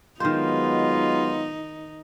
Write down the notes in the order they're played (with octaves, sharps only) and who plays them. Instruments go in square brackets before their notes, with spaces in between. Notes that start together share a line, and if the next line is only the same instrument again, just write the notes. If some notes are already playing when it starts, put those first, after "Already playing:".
[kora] D#3 C5 [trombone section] F#3 G#3 B3 [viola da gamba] D#4 [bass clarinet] F4